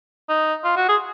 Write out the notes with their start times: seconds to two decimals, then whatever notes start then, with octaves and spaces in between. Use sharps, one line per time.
0.29 D#4
0.65 F4
0.77 F#4
0.89 G#4